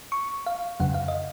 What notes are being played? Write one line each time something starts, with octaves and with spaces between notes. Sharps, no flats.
C#6
F5
F2 C#3 F#3 F#5
F5
D#5